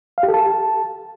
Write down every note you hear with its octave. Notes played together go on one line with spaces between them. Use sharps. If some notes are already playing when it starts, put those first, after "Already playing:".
F5
G4
A4
A5